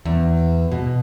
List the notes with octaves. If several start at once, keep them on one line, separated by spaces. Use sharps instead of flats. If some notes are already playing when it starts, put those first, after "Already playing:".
E2
B2